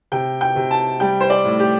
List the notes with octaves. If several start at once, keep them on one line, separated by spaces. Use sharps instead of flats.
C3 G5
G5
C3
A5
G3 G5
C5
D5
A2
G4